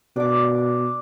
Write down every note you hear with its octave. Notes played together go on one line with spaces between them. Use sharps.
B2 D4 D6